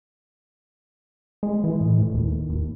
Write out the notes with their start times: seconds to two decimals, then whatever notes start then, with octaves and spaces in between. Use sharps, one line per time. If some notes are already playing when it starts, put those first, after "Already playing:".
1.43 G#3
1.64 E3
1.81 A2
2.02 A2
2.14 D#2
2.49 D#2